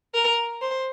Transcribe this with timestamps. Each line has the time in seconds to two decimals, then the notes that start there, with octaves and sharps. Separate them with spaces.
0.14 A#4
0.62 C5